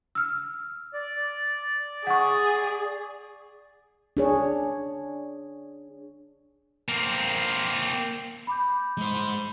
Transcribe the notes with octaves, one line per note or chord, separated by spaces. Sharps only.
E6 F6
D5
G#4 F#5 C#6
D4 G#4 C#5
A#3 C4
B5 D6 G6
G#3 C5